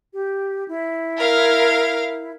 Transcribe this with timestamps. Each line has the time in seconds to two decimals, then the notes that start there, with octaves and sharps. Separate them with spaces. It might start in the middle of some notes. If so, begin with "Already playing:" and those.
0.13 G4
0.68 E4
1.18 A#4 F5